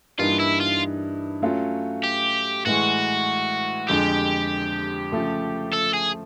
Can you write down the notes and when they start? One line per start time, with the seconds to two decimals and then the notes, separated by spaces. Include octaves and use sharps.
0.18 G2 E3 G3 A#3 D#4 F4
0.39 E4
0.60 F4
1.42 F#3 A3 C#4 F4
2.04 G4
2.66 A2 E3 G#3 F#4
3.89 F2 D3 F3 G#3 G4
5.12 C#3 F3 A3
5.73 A4
5.94 G#4